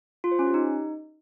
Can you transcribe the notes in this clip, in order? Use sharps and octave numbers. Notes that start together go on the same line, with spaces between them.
F4
C5
C#4
G4
D#4